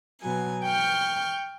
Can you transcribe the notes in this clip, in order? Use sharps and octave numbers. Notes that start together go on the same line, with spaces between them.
B2 F#3 G#5
G5 C#6 F6 G6